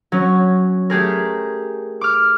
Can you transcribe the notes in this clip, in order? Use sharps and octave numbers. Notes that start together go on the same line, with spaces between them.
F#3 C#4
A3 G4 G#4 A#4
D6 F6